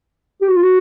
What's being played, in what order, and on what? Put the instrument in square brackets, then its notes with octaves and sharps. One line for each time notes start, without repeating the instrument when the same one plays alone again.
[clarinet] G4
F#4
F4
F#4